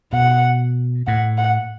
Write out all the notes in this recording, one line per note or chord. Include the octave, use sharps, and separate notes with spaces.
B2 F#5
A2 F#5
F#5